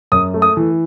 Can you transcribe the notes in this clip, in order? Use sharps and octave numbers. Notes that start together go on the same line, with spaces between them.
F#2 D#6
A3
D#6
E3